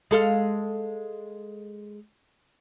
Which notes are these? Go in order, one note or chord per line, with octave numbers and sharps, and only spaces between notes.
G#3 A4 F5